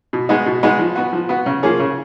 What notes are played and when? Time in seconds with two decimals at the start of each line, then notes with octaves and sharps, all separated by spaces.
0.13 B2
0.29 G#3 B3 D#4 F#4
0.46 B2
0.63 G#3 B3 D#4 F#4
0.79 F3
0.96 B3 F#4
1.13 F3
1.29 B3 F#4
1.46 C#3
1.63 F3 A#3 C#4 G#4
1.79 C#3